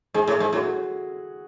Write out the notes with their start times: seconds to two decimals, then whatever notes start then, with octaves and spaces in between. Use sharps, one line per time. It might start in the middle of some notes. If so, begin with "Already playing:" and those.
0.14 G#2 G#4
0.28 A2
0.40 G#2
0.53 A2 F#4